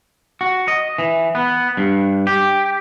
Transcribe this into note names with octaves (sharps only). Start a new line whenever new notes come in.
F#4
D#5
E3
B3
G2
G4